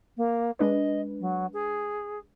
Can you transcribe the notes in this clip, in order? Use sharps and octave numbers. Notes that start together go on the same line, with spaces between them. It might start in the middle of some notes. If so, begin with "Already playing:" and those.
A#3
G#3 D4 B4 D#5
F#3
G#4